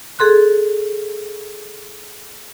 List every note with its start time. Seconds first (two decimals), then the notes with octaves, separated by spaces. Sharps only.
0.19 G#4 A4 C6 F#6